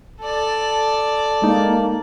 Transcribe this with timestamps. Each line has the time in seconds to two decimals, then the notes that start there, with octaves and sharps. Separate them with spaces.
0.21 A4 D5
1.42 G#3 A#3 D#4